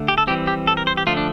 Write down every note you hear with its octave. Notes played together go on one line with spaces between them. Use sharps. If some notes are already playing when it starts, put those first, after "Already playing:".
Already playing: D3 A3
G4
A4
E3 G3 C4 G4
G4
A4
A#4
C5
G4
D3 F3 A3 F4
D4